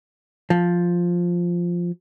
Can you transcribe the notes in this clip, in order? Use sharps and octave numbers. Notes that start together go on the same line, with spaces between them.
F3